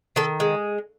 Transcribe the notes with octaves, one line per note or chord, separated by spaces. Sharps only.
D#3 A4
G#3